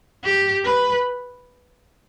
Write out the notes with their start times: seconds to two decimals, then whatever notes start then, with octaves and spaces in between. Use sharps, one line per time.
0.24 G4
0.65 B4